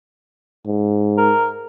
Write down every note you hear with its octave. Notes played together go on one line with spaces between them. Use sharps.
G#2
A#4